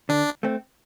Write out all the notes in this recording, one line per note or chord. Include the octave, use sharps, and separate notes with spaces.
D3 D4
A3 C4